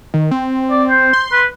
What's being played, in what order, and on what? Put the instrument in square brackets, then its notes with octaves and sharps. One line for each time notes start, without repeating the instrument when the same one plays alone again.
[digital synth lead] D#3
C4
[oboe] D5
C5
[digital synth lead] C6
[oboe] B4